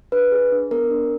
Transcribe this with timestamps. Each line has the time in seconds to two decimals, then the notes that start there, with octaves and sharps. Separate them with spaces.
0.12 D4 B4
0.32 G#4
0.52 D4
0.71 B3 A#4
0.91 D4